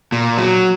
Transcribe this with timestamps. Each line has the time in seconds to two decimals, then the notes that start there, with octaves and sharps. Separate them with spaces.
0.12 A#2
0.38 F#3